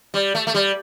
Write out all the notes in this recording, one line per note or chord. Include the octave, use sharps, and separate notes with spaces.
G3
A3
A3
G3